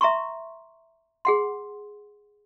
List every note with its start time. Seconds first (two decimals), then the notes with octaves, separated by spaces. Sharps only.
0.01 E5 A#5 C6 C#6
1.25 G#4 F#5 C6